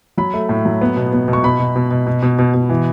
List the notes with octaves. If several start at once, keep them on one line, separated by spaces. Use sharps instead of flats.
F#3 B5
A3
A2
F#3
B3
B2
B3
B2
C#6
B2 B5
B2
B2
B2
B2
B2
B2
B2
E3